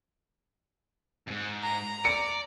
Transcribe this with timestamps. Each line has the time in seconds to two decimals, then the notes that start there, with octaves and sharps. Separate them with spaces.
1.28 F2 G#2
1.63 A#5
2.05 D5 C#7